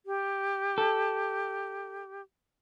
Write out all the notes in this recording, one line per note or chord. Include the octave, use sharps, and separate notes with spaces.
G4
A4